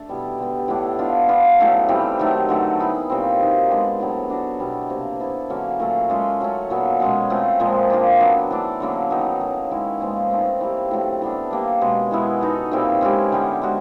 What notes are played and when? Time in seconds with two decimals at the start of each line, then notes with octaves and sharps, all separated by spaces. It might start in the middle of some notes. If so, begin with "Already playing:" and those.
Already playing: A3 D4 A4
0.09 B2 G3 B3 E4
0.39 D3 G3 B3
0.68 A2 E3 A3 D4
0.99 B3 D4 F4
1.28 B3 D4 F4
1.59 A2 F#3 A3 C#4
1.89 E3 G3 C4
2.19 D#3 F#3 A3
2.49 D3 F#3 A3
2.80 B3 E4 G#4
3.10 A#2 G3 C4
3.39 F#3 A#3 D#4
3.69 G#3 B3 D4 G4
3.99 A2 F#3 B3 D4
4.29 B3 D4 F#4
4.60 B2 G3 B3 E4
4.89 C3 F3 A#3
5.20 B3 E4 A4
5.50 D3 F#3 A#3 C#4
5.79 A#2 F#3 A3 C#4
6.10 G#3 C#4 F4 A4
6.41 F#3 A3 C#4
6.70 A#2 F#3 B3
7.00 B2 G#3 C#4
7.30 A3 C4 F4
7.60 A#2 F3 G#3
7.90 A#3 D4 F4
8.20 F#3 B3 D4
8.51 E3 A3 D4
8.80 D3 F#3 A#3 C#4
9.10 D#3 F#3 B3 D#4
9.40 A2 F#3 A#3
9.71 D#3 G#3 C#4 E4
10.01 A#2 F3 G#3 B3
10.31 A3 C4 D#4 G#4
10.61 E3 G3 A#3
10.91 A2 F#3 A3 D4
11.22 E3 G3 B3 D4
11.51 G3 A#3 D4
11.81 B2 G#3 C#4
12.11 E3 G#3 B3 E4
12.41 B3 D#4 F#4 A4
12.71 A#2 G3 C4 E4
13.01 G#3 C#4 E4 G4
13.32 D3 G3 B3
13.62 G#3 C#4 F#4